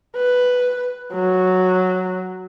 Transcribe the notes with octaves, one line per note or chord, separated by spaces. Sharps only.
B4
F#3